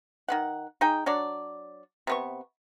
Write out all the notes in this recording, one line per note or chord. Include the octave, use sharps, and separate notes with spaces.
D#3 B3 F#5
D#4 G#4 G5
F#3 D4 C#5 D5
C3 B3 C#6